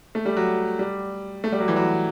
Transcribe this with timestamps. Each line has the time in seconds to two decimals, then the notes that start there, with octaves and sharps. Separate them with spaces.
0.15 A3
0.25 G3
0.37 F#3
0.79 G3
1.44 A3
1.52 G3
1.60 F#3
1.68 E3
1.76 F#3